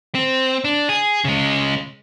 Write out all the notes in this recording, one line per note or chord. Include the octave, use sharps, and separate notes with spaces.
C4
D4
G#4
C#3 G#3